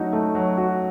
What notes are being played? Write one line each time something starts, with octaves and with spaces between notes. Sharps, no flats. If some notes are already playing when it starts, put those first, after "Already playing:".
Already playing: F#3 A3 D#4 F#4
A3
F#3
F#4